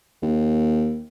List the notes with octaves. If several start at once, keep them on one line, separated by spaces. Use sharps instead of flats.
D#2